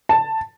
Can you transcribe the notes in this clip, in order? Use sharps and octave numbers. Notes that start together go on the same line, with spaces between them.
A5